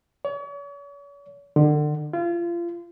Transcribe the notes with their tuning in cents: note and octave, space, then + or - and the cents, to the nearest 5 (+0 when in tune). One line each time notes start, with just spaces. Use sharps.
C#5 +40
D3 +30
F4 -30